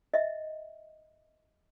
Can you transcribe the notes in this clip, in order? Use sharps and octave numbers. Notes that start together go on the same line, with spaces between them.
D#5 E5